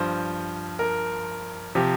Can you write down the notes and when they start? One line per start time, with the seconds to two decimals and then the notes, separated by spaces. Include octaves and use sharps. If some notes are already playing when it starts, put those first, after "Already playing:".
Already playing: G2 F3 C5
0.79 A#4
1.75 C3 F3 G4